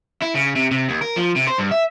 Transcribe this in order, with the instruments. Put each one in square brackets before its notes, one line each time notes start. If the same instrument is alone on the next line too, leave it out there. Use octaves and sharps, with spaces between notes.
[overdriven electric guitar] E4
C#3
C3
C3
D#2
A#4
F3
C3
C5
G2
E5